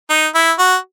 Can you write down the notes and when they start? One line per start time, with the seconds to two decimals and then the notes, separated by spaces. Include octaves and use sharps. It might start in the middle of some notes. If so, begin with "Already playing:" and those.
0.10 D#4
0.35 E4
0.58 F#4